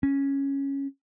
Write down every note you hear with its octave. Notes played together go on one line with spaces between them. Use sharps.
C#4